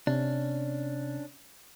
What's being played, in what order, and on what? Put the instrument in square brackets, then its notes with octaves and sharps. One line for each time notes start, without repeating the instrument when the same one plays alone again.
[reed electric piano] C3 [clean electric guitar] C#4 D4